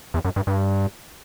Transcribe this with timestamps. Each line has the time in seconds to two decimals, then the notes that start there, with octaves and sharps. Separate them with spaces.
0.14 E2
0.25 F#2
0.36 G2
0.47 G2